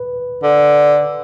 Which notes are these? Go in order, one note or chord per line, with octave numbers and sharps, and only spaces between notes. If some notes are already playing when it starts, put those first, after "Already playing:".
Already playing: B4
D3